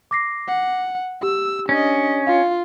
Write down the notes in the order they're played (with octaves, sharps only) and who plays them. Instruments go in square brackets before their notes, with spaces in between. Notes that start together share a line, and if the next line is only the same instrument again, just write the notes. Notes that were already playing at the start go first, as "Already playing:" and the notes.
[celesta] D6 A#6 C7
[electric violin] F#5
[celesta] G4 [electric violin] E6
[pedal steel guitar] C#4 [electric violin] D4 D#5
[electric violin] F4 [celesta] F5